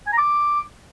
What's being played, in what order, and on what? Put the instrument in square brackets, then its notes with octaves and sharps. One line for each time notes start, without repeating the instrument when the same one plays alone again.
[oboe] G#5
A#5
D6